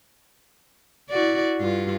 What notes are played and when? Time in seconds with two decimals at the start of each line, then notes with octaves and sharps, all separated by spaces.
1.10 E4 F#4 D5
1.60 G2 F4